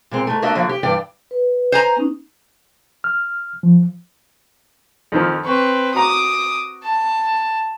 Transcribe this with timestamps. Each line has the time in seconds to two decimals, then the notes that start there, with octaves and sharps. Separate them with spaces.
0.11 A#2 G#3 C4
0.27 G#2 A3
0.42 A3 A#3 D4 F#4 D#5 E5
0.55 D3 F3 F#3 A#3
0.69 G4
0.83 G2 E3 D5 G5
1.31 B4
1.72 C5 G#5 A#5
1.96 B3 C#4 D#4
3.04 F6
3.63 F3
5.12 F2 D#3 F3
5.45 C4 B4 C#6
5.94 F#4 A#5 D6 D#6
6.83 A5